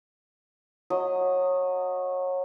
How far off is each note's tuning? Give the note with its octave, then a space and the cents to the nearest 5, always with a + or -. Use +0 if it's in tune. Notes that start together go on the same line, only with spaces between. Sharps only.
F#3 -20 D#5 +0